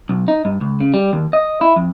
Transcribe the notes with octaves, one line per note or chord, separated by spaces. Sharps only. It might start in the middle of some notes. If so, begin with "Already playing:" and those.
B1
D#4
G2
C#2
C#3
G3
D#2
D#5
E4
F2